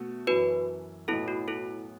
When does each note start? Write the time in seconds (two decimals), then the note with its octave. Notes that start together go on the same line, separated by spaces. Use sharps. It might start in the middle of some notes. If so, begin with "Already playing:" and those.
Already playing: B2 A3 F#4
0.27 F#2 E3 C#4 F#4 B4
1.08 B1 A2 F#3 B3 E4 A4
1.28 F#4
1.48 E4 A4